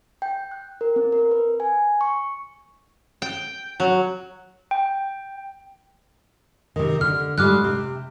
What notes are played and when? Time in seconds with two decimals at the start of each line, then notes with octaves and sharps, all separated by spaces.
0.22 G5
0.51 F#6
0.81 A#4
0.96 C4
1.12 A#4
1.31 B4
1.60 G#5
2.01 C#6
3.22 G5
3.80 F#3
4.71 G5
6.76 C3 D#3
7.01 D3 F6
7.38 G#2 G3 G#3 D6 F6 F#6
7.64 C3